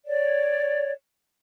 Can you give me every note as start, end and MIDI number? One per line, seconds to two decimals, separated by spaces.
0.06 0.91 73
0.06 0.91 74